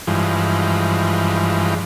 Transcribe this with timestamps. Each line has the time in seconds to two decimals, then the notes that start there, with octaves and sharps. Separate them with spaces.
0.07 G2 E3 F3 G#3